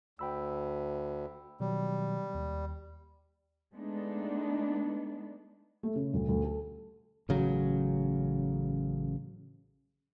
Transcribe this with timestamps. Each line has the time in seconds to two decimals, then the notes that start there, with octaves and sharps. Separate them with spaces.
0.19 D2 G5 B5 E6
1.60 B2 D#3 F#3 G3
2.35 D#2
3.75 G#3 A3 B3 D4 D#4
5.83 A3
5.96 C#3
6.14 D2
6.29 D2
6.44 A4
7.29 A1 C#3 F#3